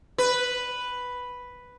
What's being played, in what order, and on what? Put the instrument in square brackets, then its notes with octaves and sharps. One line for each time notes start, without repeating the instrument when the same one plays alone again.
[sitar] B4